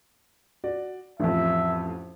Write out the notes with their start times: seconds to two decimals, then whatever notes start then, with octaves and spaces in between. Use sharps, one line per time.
0.64 F#4 D5
1.20 A1 F2 E5